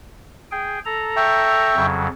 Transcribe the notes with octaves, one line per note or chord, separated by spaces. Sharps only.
G#4 G5
A4 A#5
E5 G5 C#6
F2 C#3 F#3